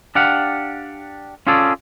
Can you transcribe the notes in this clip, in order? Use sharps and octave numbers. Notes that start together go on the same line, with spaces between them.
D4 G4 F5 F#5
C#4 F4 G#4 A4 D5